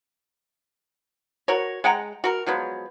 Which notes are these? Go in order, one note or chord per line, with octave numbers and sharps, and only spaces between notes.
F#4 A#4 C#5
G#3 F#5 G5 A#5
F#4 A#4
F3 F#3 G#3 B3